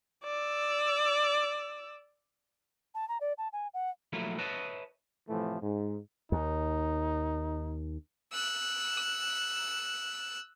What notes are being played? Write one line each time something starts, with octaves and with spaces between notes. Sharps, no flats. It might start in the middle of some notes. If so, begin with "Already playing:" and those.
D5 E6
A5
A#5
D5
A5
G#5
F#5
F3 F#3 A3 A#3 E4
B4 C#5 D#5 E5 A5
A2 C3 E3 F3 A3
G#2
D#2 D#4
E6 F#6